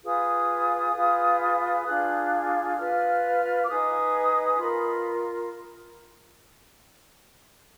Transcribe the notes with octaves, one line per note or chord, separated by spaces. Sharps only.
F4 G#4 B4 D#6
F4 G#4 B4
D4 F4 G#4 F#6
F4 B4 F6
D6
D#4 G#4 B4 D#6
F4 A#4 B5